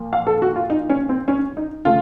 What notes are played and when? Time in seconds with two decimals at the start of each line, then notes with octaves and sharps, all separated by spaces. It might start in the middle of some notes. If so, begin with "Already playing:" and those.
Already playing: A#2 F3
0.13 F5
0.27 A4
0.42 F#4
0.56 F4
0.70 D#4
0.90 C#4
1.09 C4
1.28 C#4
1.57 D#4
1.85 C#3 A3 F4